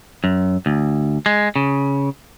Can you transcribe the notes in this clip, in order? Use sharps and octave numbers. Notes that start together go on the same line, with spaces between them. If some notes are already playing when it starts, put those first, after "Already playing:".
F#2
D2
G#3
C#3